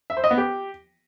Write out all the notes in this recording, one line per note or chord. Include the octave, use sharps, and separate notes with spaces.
E5
C5
D#5
B3
G4